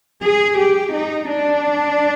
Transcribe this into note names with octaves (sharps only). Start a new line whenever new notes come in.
G#4
G4
D#4
D4